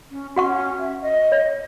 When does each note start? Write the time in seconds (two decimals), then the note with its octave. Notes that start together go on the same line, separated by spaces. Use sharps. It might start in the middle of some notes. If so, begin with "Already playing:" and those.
0.11 C#4
0.36 C#4 F#4 F#5 C#6
0.79 E5
1.02 D#5
1.32 C#5